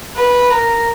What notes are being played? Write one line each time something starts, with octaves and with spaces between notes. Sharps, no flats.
B4
A#4